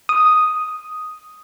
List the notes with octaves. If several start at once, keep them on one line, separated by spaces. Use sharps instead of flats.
D#6